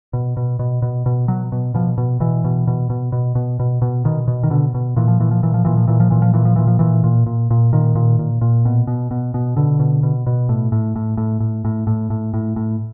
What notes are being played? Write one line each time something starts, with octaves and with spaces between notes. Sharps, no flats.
B2
B2
B2
B2
B2
B2 F#3
B2
B2 F3
B2
B2 E3
B2
B2
B2
B2
B2
B2
B2
B2 D#3
B2
D#3
B2 D3
B2
A#2 E3
F3
A#2 E3
F3
A#2 E3
F3
A#2 E3
F3
A#2 E3
F3
A#2 E3
F3
A#2 E3
F3
A#2 E3
F3
A#2 E3
A#2
A#2
A#2
A#2 D#3
A#2
A#2
A#2
B2
B2
B2
B2
B2 D3
B2
B2
B2
A2
A2
A2
A2
A2
A2
A2
A2
A2
A2